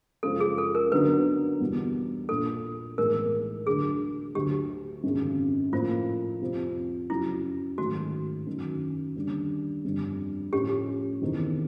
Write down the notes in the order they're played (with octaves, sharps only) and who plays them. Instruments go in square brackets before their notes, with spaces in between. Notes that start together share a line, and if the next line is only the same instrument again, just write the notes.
[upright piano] F#2 C#3 F3 G#3 [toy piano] A4
[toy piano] G#4
A4
A#4
[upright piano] D2 D3 F#3 B3 D#4 [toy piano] B4
[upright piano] E2 B2 G3 B3
[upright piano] A#1 A#2 F3 A#3 [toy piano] A4
[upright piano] B1 A2 E3 G#3 [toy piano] A#4
[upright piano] D2 D3 F#3 [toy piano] G#4
[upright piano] D2 D3 F#3 [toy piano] G4
[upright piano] G#1 F#2 C#3
[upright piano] A2 F3 A#3 [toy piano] F4
[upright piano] F2 C3 F3
[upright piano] F#2 C#3 F#3 [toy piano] E4
[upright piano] G#2 D#3 F#3 A3 [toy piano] F#4
[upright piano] F#2 D#3 F#3
D#2 D3 G3
G1 F2 D3 G3
[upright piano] A2 F3 A3 C#4 [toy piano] G4
[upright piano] E2 C3 D#3